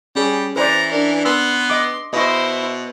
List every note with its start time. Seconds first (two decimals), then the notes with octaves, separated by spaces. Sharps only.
0.15 G3 C#4 G#4 C#5
0.56 E3 B4 C5 D5 A#5
0.91 D4 A#4
1.25 B3 C6 E6
1.70 D#5 D6
2.13 B2 E4 C5 D#5 C#6